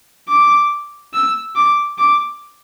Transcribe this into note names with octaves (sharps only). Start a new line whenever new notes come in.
D6
E6
D6
D6